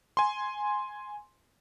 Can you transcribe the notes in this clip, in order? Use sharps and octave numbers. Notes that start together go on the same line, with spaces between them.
G#5 C6